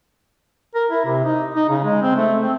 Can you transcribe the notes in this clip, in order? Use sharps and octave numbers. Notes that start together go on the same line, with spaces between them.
A#4
E4
C3
D#4
D#4
C#3
G#3
C4
A3
C4